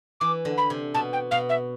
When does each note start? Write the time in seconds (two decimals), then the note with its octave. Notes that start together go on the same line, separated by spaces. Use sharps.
0.21 E3 D6
0.45 D3
0.58 B5
0.70 C3
0.94 B2 A5
1.13 G5
1.31 B2 F5
1.49 E5